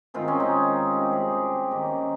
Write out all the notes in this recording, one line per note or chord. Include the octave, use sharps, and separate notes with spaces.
D#3 G#3 C4 F4
C#4
D#4
C3 G3 C4 G4
G#4
G4
D#3 A#3 C#4